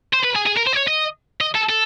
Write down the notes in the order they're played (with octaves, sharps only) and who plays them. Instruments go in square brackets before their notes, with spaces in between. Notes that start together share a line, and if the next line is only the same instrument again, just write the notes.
[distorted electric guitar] C5
B4
G#4
G#4
A#4
C5
D5
C#5
D#5
D#5
A4
A4